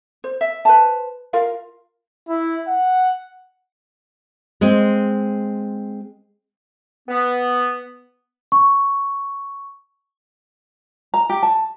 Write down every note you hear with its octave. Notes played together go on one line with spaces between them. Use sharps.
C5
E5
B4 C5 A5
F4 A#4 F5
E4
F#5
G#3 C4
B3
C#6
A#5
G4
A5